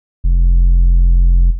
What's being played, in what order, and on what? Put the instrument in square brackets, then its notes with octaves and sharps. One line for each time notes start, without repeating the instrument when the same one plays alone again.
[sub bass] F1